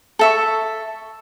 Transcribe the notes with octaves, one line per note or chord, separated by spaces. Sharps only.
A4 E5 C#6